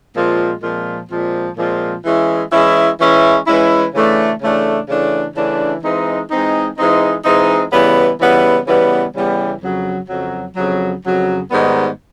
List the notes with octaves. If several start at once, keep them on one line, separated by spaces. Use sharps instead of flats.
A#2 F3 G#3 C4 F4
A#2 F3 G#3 C4 F4
A#2 F3 G#3 C4 F4
A#2 F3 G#3 C4 F4
E3 G#3 C#4 E4
E3 G#3 C#4 E4
E3 G#3 C#4 E4
E3 G#3 C#4 E4
C#3 E3 A3 D4
C#3 E3 A3 D4
C#3 E3 A3 D4
C#3 E3 A3 D4
E3 G#3 C4 D#4
E3 G#3 C4 D#4
E3 G#3 C4 D#4
E3 G#3 C4 D#4
C#3 E3 G3 B3
C#3 E3 G3 B3
C#3 E3 G3 B3
C#3 E3 G3 B3
F2 C#3 F#3
F2 C#3 F#3
F2 C#3 F#3
F2 C#3 F#3
G#2 D#3 G3 B3